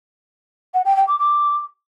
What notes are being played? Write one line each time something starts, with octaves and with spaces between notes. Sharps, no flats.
F#5
G5
G5
D6
D6